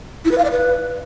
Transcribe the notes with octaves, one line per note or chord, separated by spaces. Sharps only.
E4
B4
F5
D5
B4